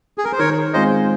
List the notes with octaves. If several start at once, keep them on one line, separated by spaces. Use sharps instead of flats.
G#4
A#4
C5
D#3 A#4 C#5
G#3 C4 F4 G#4 C5 D#5